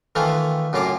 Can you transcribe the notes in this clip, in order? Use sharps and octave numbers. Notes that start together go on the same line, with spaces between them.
D#3 E3 A3 F4 A4
F#2 A2 A#3 F4 F5 D6